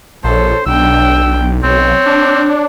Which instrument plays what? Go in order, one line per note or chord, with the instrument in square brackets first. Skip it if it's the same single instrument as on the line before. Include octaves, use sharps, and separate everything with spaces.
[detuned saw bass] A#1 [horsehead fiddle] A4 C#5 [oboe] C5
[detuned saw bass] B1 [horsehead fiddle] D4 G5 [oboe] E6
[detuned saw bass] B1 [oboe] C4 [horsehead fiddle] C#5
[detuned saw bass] D4